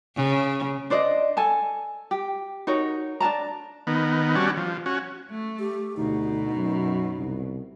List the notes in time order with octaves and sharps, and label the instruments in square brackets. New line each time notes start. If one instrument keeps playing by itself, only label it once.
[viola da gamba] C#3
[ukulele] D4 C5 D5 D#5
A4 G#5 A5
G4
D#4 F#4 A#4 C#5
D4 A#4 A5 A#5
[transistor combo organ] D#3 B3
G3 C#4 D4 F#4
F3
C#4 F#4
[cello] A3
[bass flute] G4
[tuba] D2 [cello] B2 [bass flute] D#4
[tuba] F#2
C2